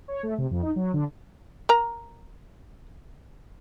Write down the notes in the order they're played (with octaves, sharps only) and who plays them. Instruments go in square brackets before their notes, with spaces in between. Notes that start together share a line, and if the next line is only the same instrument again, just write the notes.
[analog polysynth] C#5
A3
C3
F2
D#4
F#3
D3
[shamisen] A#4 A#5